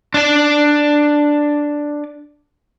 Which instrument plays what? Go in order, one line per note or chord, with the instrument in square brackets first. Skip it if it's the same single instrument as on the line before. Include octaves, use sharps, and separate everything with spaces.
[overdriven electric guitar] D4 D5